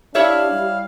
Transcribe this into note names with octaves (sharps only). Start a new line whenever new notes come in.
D4 E4 G4 C#5 E5 F5
G3